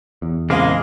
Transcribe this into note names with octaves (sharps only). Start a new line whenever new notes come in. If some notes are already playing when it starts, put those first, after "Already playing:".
E2
A#1 C#3 G#3 A#3 C4 F5